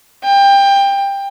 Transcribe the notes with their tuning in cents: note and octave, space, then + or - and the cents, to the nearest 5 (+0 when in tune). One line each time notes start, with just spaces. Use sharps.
G5 +20